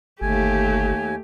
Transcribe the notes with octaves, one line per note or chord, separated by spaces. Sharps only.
G1 D#2 A3 G4 G#5